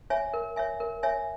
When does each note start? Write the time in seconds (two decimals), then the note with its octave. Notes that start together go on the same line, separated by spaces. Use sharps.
0.10 C#5 E5 G#5
0.34 A#4
0.56 C#5 E5 G#5
0.80 A#4
1.03 C#5 E5 G#5